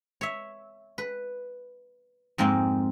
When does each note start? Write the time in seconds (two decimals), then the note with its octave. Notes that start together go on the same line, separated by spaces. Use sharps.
0.21 C#5 E5
0.98 B4
2.38 F2 G#2 G#3 A#3 C4